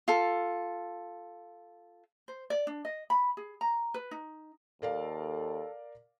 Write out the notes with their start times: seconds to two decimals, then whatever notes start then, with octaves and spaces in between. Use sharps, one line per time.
0.08 F4 A4
2.28 C5
2.50 D5
2.67 D4
2.85 D#5
3.10 B5
3.37 G#4
3.61 A#5
3.94 B4
4.11 D#4
4.82 D#2 A4 A#4 D5 F5